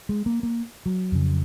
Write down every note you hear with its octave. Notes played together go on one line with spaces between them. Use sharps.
G#3
A#3
A#3
F#3
F2 C#3